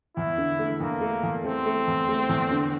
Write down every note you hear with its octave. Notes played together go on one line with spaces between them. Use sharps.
E2 E4
D3
A3
E2 A#3
A3
E2
A3 C4
A3
E2
A3
E2
D3